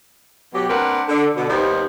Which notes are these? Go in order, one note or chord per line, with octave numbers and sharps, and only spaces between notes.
B2 F#3 G4
A#3 C4 D4 A#4 B4 F#5
D3
B2 D3
D#2 G3 B3 C4 D#4 C5